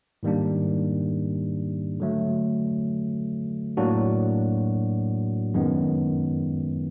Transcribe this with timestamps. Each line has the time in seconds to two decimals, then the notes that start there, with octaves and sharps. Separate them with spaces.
0.23 G#2 D#3 G3 A#3 D4
2.00 D3 F#3 A3
3.77 A2 F#3 A#3 D4 F#4
5.54 F#2 D#3 G#3 B3